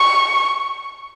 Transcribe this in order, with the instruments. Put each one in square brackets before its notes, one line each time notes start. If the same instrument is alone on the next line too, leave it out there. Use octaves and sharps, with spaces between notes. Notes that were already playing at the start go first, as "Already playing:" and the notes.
Already playing: [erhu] C#6